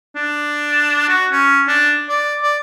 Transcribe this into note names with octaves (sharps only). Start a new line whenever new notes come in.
D4
F#4
C#4
D4
D5
D5